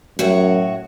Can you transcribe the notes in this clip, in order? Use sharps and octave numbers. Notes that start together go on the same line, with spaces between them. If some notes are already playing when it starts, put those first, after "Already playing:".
F#2 A2 F#4 C#5